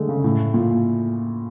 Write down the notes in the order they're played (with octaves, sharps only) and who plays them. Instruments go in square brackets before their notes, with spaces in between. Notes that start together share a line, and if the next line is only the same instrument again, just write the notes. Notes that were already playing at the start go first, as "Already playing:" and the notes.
Already playing: [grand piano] D3 G#3 A3
C#3
A2
A#2